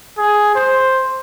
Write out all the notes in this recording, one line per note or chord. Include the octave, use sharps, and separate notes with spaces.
G#4
C5